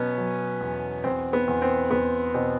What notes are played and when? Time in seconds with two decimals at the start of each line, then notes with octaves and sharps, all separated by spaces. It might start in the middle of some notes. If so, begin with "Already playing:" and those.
Already playing: B2 F#3 B3 C#4
0.18 F#3
0.61 E2
1.04 E2 C4
1.33 B3
1.48 E2
1.62 C4
1.91 E2 B3
2.34 B2 C4